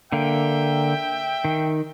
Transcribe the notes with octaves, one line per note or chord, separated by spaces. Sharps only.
D3 A#3 E5 G5
D#3